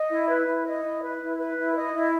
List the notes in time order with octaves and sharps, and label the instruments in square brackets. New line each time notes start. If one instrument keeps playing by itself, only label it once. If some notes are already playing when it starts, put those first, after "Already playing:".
Already playing: [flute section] D#5
E4
B4
E4
D#5
E4
B4
E4
B4
E4
D#5
E4